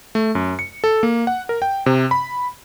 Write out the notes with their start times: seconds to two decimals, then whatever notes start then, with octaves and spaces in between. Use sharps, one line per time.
0.15 A3
0.35 F#2
0.59 C#7
0.84 A4
1.03 A#3
1.27 F#5
1.49 A#4
1.62 G5
1.86 C3
2.11 B5